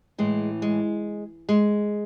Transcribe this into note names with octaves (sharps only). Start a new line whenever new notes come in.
A2 E3 G#3
G#3
G#3